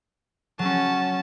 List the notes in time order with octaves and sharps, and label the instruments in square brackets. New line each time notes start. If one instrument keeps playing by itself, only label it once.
[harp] F#3 [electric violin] C#4 A5